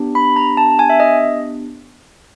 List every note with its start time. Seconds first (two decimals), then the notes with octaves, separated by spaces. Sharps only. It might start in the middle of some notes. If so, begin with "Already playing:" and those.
Already playing: B3 D4 G4
0.15 B5
0.36 A#5
0.57 A5
0.79 G#5
0.90 E5
1.00 D#5